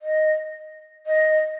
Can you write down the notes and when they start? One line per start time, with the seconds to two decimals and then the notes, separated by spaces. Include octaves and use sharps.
0.02 D#5
1.07 D#5